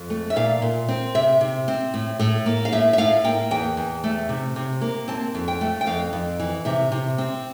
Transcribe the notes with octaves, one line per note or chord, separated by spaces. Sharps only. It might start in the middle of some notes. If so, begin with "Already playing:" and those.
Already playing: F2
A3
E5
A#2 F5
A#2
C4
C3 E5
C3
C4
A2
A2
A#3
F5
A2 E5
E5
A2 F5
A#3 G5
E2 G5
E2
A3
C3
C3
A#3
C4 A5
F2
G5
A3
G5
F2 F5
F2
E3
C3 E5
C3
C4